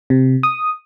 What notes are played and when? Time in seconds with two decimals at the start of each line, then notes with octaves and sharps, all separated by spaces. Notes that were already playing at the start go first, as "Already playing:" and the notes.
0.10 C3
0.43 D#6